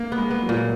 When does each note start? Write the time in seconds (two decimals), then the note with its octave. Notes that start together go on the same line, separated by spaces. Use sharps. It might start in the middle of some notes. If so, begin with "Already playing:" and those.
Already playing: A#3
0.12 B3
0.18 G#3
0.30 B3
0.43 F#3
0.49 A#2